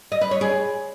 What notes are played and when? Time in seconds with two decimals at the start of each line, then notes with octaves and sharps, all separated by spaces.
0.12 D#5
0.21 B4
0.31 C#5
0.41 G#4